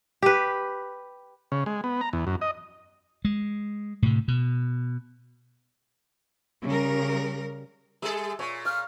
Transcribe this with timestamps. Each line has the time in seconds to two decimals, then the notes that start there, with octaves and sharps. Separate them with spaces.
0.22 G4 B4
1.52 C#3
1.66 G#3
1.84 B3
2.01 A#5
2.13 E2
2.27 F#2
2.41 D#5
3.25 G#3
4.02 A2 C3
4.28 B2
6.63 C#3 G3 A#4
8.02 G3 G#4 A4 E5
8.39 A#2 C#5
8.65 F5 F6